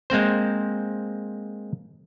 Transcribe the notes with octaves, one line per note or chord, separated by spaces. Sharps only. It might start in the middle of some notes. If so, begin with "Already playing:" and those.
G#3 A#3 C4 C5